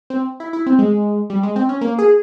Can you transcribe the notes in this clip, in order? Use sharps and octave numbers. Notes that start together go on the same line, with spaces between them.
C4
E4
E4
C4
G#3
G3
G#3
C4
C#4
A#3
G#4